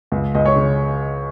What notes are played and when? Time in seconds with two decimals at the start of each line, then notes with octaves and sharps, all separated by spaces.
0.12 C#2
0.35 C#2 D#5
0.46 C#5
0.56 C#3